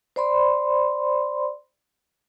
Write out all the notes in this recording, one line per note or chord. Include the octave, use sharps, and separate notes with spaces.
C5 D5 B5 C6